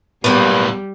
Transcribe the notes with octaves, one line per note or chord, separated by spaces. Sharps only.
B1 E2 A2 G3 A#3 B3